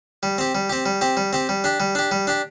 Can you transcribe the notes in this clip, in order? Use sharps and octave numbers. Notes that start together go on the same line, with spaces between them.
G3
C4 G4
G3
C4 G4
G3
C4 G4
G3
C4 G4
G3
D4 G4
G3
D4 G4
G3
D4 G4